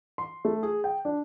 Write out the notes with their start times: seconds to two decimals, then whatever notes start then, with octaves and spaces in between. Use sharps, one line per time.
0.18 C6
0.45 A3
0.63 G#4
0.84 G5
1.05 D4